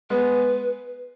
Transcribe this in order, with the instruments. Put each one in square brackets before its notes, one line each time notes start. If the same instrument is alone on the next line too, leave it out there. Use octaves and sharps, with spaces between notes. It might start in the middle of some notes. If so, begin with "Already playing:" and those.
[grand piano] G#3 B3 [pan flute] B4